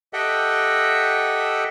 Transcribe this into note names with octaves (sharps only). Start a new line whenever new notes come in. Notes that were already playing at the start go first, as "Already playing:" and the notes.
G4 A4 D#5 E5 F#5 G5